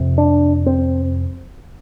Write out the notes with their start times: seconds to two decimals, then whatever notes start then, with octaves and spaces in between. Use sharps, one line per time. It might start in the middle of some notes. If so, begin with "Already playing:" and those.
Already playing: F2 C3
0.18 D4
0.66 C4